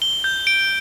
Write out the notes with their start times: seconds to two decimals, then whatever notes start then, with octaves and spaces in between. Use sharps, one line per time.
0.02 G7
0.24 G6
0.47 D7